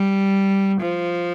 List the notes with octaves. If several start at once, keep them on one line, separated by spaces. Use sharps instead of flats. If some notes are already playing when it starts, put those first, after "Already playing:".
Already playing: G3
F3